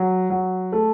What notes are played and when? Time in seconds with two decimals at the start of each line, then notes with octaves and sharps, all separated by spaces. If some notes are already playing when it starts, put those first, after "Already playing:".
Already playing: F#3
0.30 F#3
0.72 A3